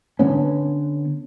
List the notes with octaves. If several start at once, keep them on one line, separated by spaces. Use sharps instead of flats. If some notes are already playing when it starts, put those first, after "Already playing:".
D3 B3 C#4